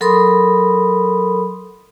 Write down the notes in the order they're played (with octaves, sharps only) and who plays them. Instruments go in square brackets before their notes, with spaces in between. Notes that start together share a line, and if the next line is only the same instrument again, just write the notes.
[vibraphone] F#3 A4 A#4 B5 C6 D#6